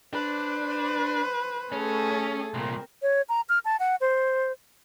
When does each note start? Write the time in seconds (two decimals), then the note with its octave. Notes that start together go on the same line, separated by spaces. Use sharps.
0.13 D4 B4 C5
1.72 A3 C#4 G#4 A4
2.54 C2 A#2 C4 A#4
3.02 C#5
3.29 A#5
3.49 F6
3.65 A5
3.80 F#5
4.01 C5